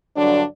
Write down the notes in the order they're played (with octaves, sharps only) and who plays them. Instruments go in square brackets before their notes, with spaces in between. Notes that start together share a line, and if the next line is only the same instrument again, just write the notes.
[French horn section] G2 D3 F#3 D4